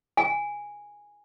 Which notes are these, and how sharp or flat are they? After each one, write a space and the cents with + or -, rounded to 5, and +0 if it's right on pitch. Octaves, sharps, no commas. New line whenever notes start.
G#5 -10